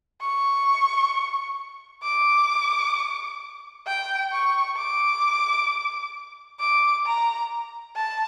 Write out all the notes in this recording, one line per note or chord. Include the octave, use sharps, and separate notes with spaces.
C#6
D6
G5
C#6
D6
D6
A#5
A5